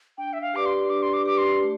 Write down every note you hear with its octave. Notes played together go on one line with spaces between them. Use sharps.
D4 G5
E5
F5
G4 B4 D5 D6
C6
D4 D6
C6
D6
G4 B4 D5 D6
C6
A3